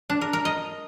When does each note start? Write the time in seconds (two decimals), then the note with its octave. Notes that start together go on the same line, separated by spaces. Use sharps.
0.10 D4
0.21 A#4
0.33 A#4
0.45 D#5